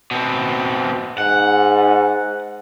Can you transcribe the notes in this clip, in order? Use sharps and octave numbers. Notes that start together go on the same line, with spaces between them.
B2 C4
G#2 F#5